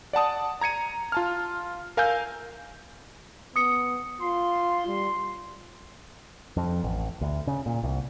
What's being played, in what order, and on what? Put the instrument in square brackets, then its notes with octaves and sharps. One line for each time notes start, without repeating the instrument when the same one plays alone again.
[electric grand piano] D5 F#5 A5 D#6
A#5 G#6 C#7 D#7
F4 A5 F6
A#4 F5 G#5 E6 G6
[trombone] B3 [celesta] D#6 C#7
[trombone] F4 [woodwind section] C6
[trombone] G3
[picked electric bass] F2
A1
D2
C#3
A#2
C2